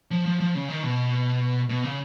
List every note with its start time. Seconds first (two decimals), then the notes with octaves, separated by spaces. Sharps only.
0.11 F3
0.26 F3
0.40 F3
0.55 C#3
0.69 D#3
0.83 B2
1.69 B2
1.84 C#3